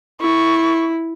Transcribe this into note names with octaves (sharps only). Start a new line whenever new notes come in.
E4 C#6